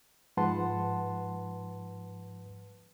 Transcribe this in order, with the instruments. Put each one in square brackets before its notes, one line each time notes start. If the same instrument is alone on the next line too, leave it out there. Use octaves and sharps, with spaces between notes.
[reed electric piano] G#2 F3 B4 F#5 A5 C6